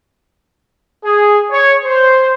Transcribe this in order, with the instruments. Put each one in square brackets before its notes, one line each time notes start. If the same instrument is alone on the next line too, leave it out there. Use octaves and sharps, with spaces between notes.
[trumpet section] G#4
C#5
C5